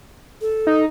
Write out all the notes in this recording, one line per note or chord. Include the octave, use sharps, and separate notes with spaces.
A4
D#4